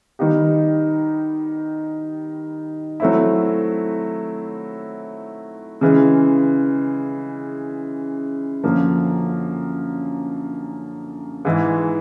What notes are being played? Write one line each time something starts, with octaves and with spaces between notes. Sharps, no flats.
D#3 G3 B3 D#4 G4
F#3 A3 C4 E4
C#3 E3 G#3
F#2 D3 F3 A#3
G#2 E3 G#3